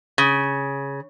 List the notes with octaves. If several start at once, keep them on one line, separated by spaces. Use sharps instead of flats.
C#3